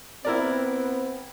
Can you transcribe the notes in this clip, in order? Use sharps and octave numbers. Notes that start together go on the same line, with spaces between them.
B3 C4 E4 A#4 D5